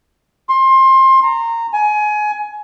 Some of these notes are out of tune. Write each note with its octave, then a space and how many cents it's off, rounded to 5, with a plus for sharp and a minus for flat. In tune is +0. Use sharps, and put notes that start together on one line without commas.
C6 +25
A#5 -15
G#5 +25